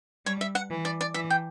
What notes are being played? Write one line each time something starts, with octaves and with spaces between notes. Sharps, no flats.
G3 C#5
E5
F#5
E3
D5
D5
E3 E5
G5